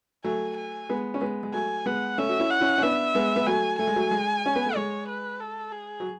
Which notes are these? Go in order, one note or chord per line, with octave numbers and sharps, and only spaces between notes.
F#3 A3 G#5
G#5
G#3 B3
C#4
G#3 B3
G#3
F#3 A3 G#5
G#3 B3 F#5
A3 C#4 E5
F#4
C#4 E4
F#5
C#4 E4
C#4
B3 D4 E5
G#3 B3
B3
F#3 A3 G#5
A3 G#5
G#3
F#3 A3
G#3
C#4
B3
A3
G#3 C#5
B4
A4
G#4
F#3